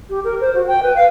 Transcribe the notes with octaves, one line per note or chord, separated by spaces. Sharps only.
G4
A#4
C5
F#4
G5
B4
F5